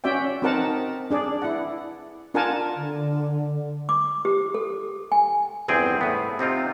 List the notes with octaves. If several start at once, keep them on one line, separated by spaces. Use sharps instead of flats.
C#4 F#4 D5 E5 G5
C4 D#4 F#4 A#4 F#5 A5
D4 G#4 D5
E4 F#5
D4 F4 A#4 F#5 G#5 A5
D3
D6
G4
A4
G#5
G1 E2 C4 G#4 G5
A2 B3
C3 C4 D#4 F4